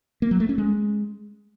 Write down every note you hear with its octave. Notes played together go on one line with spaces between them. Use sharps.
A#3
F#3
A3
C#4
G#3